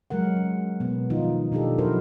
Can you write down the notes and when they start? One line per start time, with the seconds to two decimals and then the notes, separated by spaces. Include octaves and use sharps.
0.10 F#3 G#3 A#4 F#5
0.36 C#4
0.80 B2 B3
1.10 D#3 F3 D#4 F4
1.52 B2 D4 D#4 G4 A4
1.78 F3 F#3 E4 F#4 A#4 C5